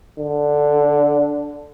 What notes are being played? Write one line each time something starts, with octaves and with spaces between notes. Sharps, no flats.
D3